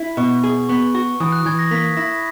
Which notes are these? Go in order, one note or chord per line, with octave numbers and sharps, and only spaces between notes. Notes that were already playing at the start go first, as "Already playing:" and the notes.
Already playing: E4
B2 C#6
G#4
B3 C#6
F#4 C#6
E3 D#6
F#6
E3 G#6
A#6
A#3 B6
E4 A#6